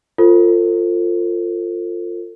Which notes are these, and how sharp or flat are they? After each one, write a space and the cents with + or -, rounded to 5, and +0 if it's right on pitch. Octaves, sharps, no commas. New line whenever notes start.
F4 +0 A4 +30 C5 +0